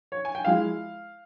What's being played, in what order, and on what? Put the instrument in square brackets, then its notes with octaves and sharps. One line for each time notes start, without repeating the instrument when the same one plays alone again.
[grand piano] C#5
G#5
G5
F3 G#3 E4 F5